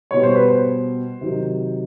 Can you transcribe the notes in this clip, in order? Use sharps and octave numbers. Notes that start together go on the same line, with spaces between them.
B2 G3 C#5
C5
B4
C5
C3 D#3 F#3